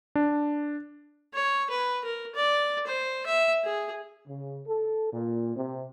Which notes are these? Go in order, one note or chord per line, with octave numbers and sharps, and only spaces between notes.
D4
C#5
B4
A#4
D5
C5
E5
G#4
C#3
A4
A#2
C3